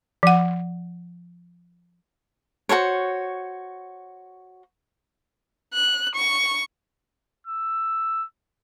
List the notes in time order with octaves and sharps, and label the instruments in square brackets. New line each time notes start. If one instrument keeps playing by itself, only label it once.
[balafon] F3 F#5
[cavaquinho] F#4 A4 C5 C#5
[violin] F#6
C#6
[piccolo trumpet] E6